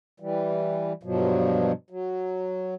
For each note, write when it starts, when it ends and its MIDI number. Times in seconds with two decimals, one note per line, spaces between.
0.20 0.93 52
0.20 0.93 55
1.03 1.72 43
1.03 1.72 47
1.03 1.72 53
1.03 1.72 54
1.90 2.75 54